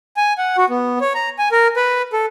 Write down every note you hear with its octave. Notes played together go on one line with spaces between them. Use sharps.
G#5
F#5
F#4
B3
C#5
A#5
G#5
A#4
B4
A4